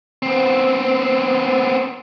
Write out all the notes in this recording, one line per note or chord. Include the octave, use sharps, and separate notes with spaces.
B3 C4